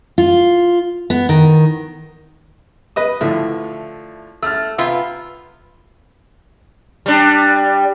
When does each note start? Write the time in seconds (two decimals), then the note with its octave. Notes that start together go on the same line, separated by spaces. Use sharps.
0.18 F4
1.10 B3
1.29 D#3
2.96 B4 D#5 D#6
3.21 A2 D3 F3 E5
4.43 A3 E6 F6
4.78 C3 B3 F4 E5
7.06 G3 D4